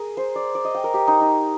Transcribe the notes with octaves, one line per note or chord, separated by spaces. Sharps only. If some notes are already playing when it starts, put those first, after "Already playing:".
Already playing: G#4 A#4
C5
D5
D5
D#5
G5
A#4
G4
D#4
D#4